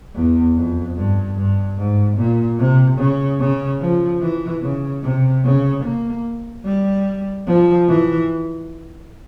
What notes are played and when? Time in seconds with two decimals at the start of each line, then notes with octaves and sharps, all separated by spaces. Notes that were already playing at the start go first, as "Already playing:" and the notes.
0.15 E2
0.55 F2
0.96 G2
1.37 G2
1.78 G#2
2.17 A#2
2.59 C3
2.99 C#3
3.39 C#3
3.80 F3
4.21 E3
4.62 C#3
5.03 C3
5.44 C#3
5.84 A#3
6.65 G3
7.47 F3
7.88 E3